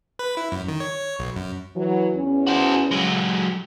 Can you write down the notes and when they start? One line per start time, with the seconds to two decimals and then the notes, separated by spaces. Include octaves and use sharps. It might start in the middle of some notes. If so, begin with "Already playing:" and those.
0.19 B4
0.37 E4
0.52 F#2
0.68 D#3
0.80 C#5
1.00 C#5
1.19 B1
1.36 F#2
1.76 E3 F#3
2.14 E2 C#4
2.47 F#4 C5
2.91 F#3 G#3